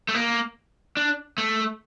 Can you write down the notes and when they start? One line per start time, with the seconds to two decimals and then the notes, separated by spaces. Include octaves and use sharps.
0.09 A3
0.14 A#3
0.97 D4
1.38 A3